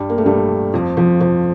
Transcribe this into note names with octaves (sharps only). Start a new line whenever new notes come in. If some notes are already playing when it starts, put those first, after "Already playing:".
Already playing: G2 G3
A#3
A3
G2 G3
F2 F3
F2 F3
F2 F3